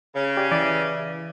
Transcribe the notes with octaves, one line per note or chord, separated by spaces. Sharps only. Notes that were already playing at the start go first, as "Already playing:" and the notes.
C#3
G4 D5
E3 D5 E5 D#7